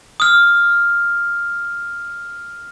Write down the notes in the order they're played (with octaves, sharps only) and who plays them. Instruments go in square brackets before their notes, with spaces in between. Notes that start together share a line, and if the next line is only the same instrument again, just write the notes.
[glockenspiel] D#6 F6